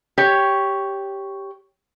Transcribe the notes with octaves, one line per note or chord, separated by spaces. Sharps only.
G4 C#5